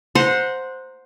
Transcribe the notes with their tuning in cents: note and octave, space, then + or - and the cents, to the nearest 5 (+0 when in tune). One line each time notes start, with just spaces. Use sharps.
C5 +0 F#5 -20 A#5 +0